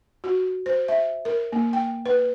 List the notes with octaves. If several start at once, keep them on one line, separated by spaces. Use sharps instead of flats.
F#4
C5
E5
A#4
A#3
G5
B4